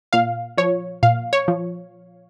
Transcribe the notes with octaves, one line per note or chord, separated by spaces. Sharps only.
A#2 F5
F3 C#5
A#2 F5
C#5
F3